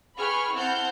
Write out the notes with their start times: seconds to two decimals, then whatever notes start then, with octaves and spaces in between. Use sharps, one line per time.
0.18 G#4 B4 G5 B5 C#6 F6
0.53 C4 E4 F#5 A5 F6 G6